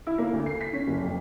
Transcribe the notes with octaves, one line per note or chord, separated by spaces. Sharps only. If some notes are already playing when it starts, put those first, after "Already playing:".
E4
A#3
D2
C7
B6
C#4
F#1
F2